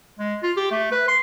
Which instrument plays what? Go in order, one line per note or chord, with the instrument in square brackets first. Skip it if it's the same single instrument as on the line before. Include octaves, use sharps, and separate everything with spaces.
[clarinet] G#3
F4
G4
A3
B4
C6